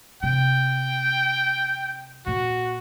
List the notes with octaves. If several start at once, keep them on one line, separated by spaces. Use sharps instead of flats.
C3 G5
A#2 A#3 F#4